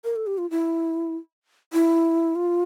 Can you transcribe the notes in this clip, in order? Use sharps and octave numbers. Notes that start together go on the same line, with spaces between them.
A#4
A4
G4
F4
E4
E4
F4